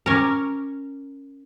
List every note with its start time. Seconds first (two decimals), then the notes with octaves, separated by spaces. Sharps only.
0.06 C#4 A#4 A#5 C#6 D6